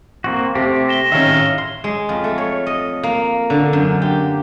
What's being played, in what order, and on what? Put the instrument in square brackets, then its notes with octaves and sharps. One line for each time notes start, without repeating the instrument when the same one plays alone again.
[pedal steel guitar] A#3 C4 F#4
[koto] C3 [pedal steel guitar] A3 C4 G4
[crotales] A#6 E7 G7
[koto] D#3 C#4 [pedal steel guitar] E5 F5
[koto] A2
[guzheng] C6
G#3
F2
A3
C#5
D#5
A#3
D3
F#2
G4